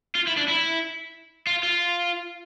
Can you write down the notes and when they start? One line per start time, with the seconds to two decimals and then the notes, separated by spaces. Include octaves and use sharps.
0.15 F4
0.27 E4
0.37 D4
0.48 E4
1.47 F4
1.63 F4